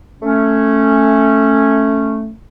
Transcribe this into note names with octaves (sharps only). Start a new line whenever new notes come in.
A3 C#4